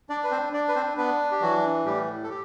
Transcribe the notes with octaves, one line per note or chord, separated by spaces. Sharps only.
D4 D5
B4
C4 C5
D4 D5
B4
C4 C5
B3 D4 B4
G4
E3 F#3 F#4
A2 G3 G4
A4
G4